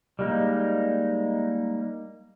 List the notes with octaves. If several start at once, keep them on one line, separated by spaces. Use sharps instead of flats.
G3 G#3 A#3 D#4